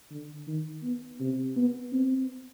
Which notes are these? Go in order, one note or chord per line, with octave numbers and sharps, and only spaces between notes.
D3
D#3
B3
C3
B3
C4